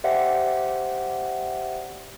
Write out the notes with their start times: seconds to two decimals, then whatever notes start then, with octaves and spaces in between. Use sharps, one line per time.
0.04 G4 C5 D5 E5 F#5 G5